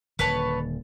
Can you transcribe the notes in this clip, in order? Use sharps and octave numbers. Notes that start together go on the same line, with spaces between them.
D#1 D3 B4 C#5 A5